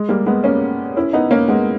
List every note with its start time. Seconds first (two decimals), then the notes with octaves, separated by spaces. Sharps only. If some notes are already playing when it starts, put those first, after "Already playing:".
Already playing: G#3
0.09 G3 A#3
0.26 G#3 B3
0.44 A#3 C#4
0.96 C#4 E4
1.13 B3 D#4
1.31 A#3 C#4
1.48 G#3 B3